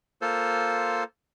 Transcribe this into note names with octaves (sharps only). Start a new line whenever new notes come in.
A#3 F4 A4 C5